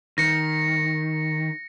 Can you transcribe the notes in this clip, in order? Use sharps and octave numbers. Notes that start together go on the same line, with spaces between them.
D#3 A#6 C#7